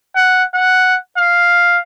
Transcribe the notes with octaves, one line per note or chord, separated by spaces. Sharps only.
F#5
F#5
F5